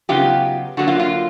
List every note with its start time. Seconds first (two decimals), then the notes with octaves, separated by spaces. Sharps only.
0.09 C#3 F#3 B3 D#4 F4 G4
0.77 D3 F#3 A#3 F#4
0.88 F4
0.99 F4